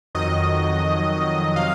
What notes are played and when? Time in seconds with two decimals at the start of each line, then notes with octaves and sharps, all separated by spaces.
0.15 F2 D#3 F#3 D#5
1.56 C3 F#3 F5